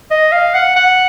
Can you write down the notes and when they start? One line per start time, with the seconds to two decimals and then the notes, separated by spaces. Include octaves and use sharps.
0.11 D#5
0.32 F5
0.54 F#5
0.76 F#5